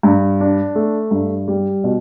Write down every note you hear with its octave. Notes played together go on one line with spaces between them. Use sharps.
G2
D4
A3
G2
G3
B2